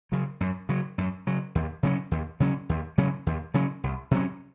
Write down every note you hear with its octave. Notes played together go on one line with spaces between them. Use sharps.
C#3 F#3
F#2
C#3 F#3
F#2
C#3 F#3
D#2
C#3 F#3 C#4
D#2
C#3 F#3 C#4
D#2
C#3 F#3 C#4
D#2
C#3 F#3 C#4
C2
C3 F#3 C#4